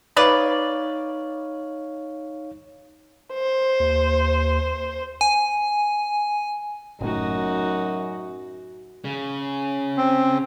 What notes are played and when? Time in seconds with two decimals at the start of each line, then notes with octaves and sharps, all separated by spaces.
0.17 D#4 B4 C#5 D5 F5
3.34 C5
3.80 D#2
5.21 G#5
7.01 F#1 F#2 A2 D#4 F#4
9.05 C#3
9.97 C4